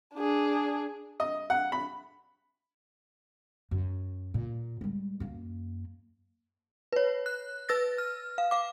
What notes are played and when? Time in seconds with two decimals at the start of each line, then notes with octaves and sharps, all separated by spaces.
0.15 D4 G#4
1.20 D#5
1.50 F#5
1.72 B5
3.71 F#2
4.34 A#2
4.81 G3 G#3
5.20 F#2 A#3
6.92 B4 C#5
7.26 F#6
7.69 B4 E6 A6 A#6
7.98 F6
8.38 F5
8.51 F5 D6